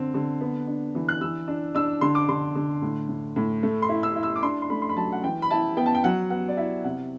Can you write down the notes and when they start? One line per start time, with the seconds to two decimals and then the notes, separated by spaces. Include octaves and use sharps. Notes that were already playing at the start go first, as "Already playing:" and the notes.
Already playing: D3 C4
0.14 D3
0.41 B3
0.67 D4
0.95 E3
1.09 F#6
1.21 E3 E6
1.48 D4
1.75 D4 E6
2.01 D3 C6
2.15 D6
2.29 D3 C6
2.55 D3
2.82 A2
3.09 A2
3.36 A2
3.63 A3
3.82 C6
3.89 E4
4.03 E6
4.16 E4
4.23 E6
4.36 D6
4.42 D4 C6
4.62 C6
4.70 A3 B5
4.82 C6
4.89 B5
4.97 F#3 A5
5.12 F#5
5.24 E3 G5
5.42 B5
5.51 E4 A5
5.77 B3 G5
5.86 A5
5.95 G5
6.04 F#3 F#5
6.30 B3 F#5
6.48 D5
6.57 E4 E5
6.84 C3 F#5